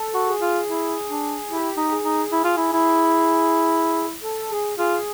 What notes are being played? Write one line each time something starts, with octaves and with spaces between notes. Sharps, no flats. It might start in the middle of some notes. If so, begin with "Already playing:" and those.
Already playing: A4
F#4
G#4
F4
E4
D4
E4 G4
D#4
G#4
D#4
E4
F4
E4
E4
A4
G#4
F4 G#4